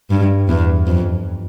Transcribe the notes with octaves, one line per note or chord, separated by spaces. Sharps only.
G2
E2
F2